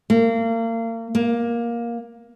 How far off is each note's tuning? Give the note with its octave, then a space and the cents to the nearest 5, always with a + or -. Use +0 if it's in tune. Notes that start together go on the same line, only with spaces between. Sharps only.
A#3 -35
A#3 +10